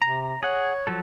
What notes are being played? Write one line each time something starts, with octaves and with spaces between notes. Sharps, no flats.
C3 A#5
G#4 C#5 F#5
F3 F#3 A4